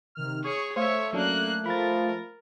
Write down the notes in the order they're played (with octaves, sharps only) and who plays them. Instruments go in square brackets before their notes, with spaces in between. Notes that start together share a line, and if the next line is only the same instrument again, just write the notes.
[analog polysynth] C3 D#3 F6
[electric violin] G#4 C#5 [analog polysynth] C#6
[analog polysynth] A3 [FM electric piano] C5 F5 [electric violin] C#5 E5
[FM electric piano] F#3 C#4 D4 [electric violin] A#3 F#6
[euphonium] F3 [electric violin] A#4 [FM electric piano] B5 A6